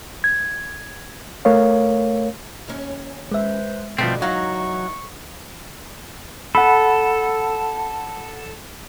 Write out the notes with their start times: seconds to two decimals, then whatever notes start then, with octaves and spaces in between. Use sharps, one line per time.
0.24 G#6
1.45 A3 A#4 C#5 F5
2.68 D#2 C#4
3.32 G#3 B4 C5 E5
3.99 G2 B2 D3 F3 A3 C4 E4 F#4
4.22 E2 F#3 D#4 F5 C#6
6.55 A4 F#5 B5